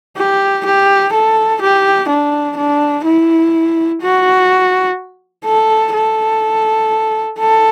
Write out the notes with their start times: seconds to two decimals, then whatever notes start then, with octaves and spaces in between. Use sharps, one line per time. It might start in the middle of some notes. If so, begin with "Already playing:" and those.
0.17 G4
0.65 G4
1.13 A4
1.61 G4
2.08 D4
2.57 D4
3.05 E4
4.02 F#4
5.45 A4
5.94 A4
7.39 A4